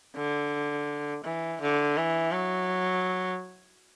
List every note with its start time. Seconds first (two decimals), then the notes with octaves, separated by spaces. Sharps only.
0.16 D3
1.24 E3
1.61 D3
1.97 E3
2.32 F#3